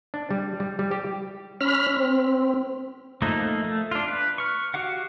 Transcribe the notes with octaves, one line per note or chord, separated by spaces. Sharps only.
D4
G3
G3
G3
G4
C#4 B5 F6
C4
F3 A3 A#3 D#4
A3
D4 F4
B4
C#6 F6
F#4 G4 F5 F#5